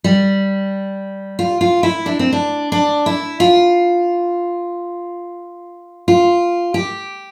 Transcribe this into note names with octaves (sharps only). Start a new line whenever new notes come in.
G3
F4
F4
E4
D4
C4
D4
D4
E4
F4
F4
G4